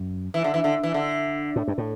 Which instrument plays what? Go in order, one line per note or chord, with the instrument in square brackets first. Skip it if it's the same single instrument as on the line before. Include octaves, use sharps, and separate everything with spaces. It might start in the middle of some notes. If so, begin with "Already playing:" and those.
Already playing: [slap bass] F#2
[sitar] E3
D3
E3
D3
E3
D3
[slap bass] A2
G2
A2